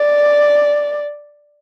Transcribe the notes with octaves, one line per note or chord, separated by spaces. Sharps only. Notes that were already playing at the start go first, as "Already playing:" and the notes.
Already playing: D5